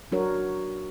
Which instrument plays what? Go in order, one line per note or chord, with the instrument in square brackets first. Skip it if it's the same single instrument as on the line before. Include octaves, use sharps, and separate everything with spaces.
[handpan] F#3 D4 F#4 A#4 C#5